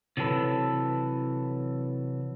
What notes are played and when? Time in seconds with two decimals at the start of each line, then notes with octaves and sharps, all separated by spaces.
0.17 C3 E3 F#3 A4 B4